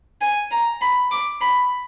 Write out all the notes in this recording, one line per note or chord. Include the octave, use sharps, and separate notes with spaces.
G#5
A#5
B5
D6
B5